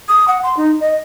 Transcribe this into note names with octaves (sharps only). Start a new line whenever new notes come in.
D#6
F#5
C6
D#4
D#5